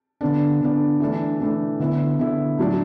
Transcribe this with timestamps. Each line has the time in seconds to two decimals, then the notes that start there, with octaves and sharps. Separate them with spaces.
0.21 D3 B3 D4
0.61 D3 B3 D4
1.00 E3 A3 D4
1.40 E3 A3 D4
1.80 D3 B3 E4
2.19 D3 B3 E4
2.59 A2 F#3 D4